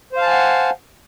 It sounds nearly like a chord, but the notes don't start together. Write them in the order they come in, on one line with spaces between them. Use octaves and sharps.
C5 F5 A5 G#5 F#5